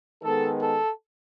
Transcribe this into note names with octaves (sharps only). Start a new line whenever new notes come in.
D#3 G#3 B3 A4
A4